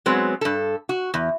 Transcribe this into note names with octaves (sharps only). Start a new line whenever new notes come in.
F#3 G#3 B3 C4
G2 A4
F#4
E2